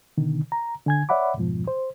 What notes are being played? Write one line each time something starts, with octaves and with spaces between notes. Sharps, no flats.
B2 D3 D#3
A#5
D3 G#5 G#6
C#5 D5 E5 F#5 B5 D6
F2 G#2 B2 F3
C5